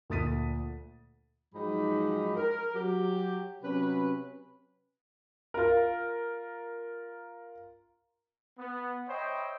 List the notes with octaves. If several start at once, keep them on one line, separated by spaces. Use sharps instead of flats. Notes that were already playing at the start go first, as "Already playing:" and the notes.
D2 A#2 D#6 A6 B6 D#7
G#2 F3 F#3 D#4 G4 B5
A#4
F#3 G4
C3 F#3 C#4 B4
F4 A#4
B3
C5 C#5 D#5 E5 G5 B5